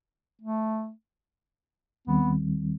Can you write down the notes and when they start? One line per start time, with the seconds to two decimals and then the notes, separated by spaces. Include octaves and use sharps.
0.41 A3
2.07 D#2 D#3 G3 B3 C4